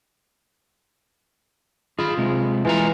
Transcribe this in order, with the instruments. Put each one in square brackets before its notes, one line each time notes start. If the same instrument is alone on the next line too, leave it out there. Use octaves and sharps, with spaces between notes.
[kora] F4 [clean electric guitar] G#4 B5
[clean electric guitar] C3 G#3
[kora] E3 [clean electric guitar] G#3 F4 A#5